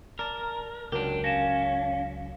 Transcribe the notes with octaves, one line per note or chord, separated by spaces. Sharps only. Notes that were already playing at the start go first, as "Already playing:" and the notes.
A#4 D5 A5 A#5
C#2 F#3 D4 G4 A#4
C#4 F5 A#6 E7